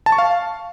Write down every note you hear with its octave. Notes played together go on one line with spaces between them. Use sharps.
A5
C#6
F5